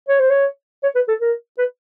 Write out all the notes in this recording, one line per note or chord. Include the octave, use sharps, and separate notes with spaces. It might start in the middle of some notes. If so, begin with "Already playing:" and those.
C#5
C5
C#5
C#5
B4
A4
A#4
B4